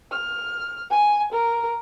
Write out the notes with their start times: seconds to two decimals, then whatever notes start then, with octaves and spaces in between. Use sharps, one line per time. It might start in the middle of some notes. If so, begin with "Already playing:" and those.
0.12 F6
0.91 G#5
1.32 A#4